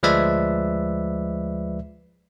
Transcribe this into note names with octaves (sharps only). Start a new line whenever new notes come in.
D2 F3 G#3 B4 D5 E5